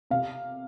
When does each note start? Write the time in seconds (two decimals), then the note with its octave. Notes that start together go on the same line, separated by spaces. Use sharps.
0.11 C3 F5